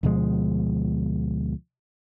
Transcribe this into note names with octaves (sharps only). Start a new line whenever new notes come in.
D2 B2 F3 G#3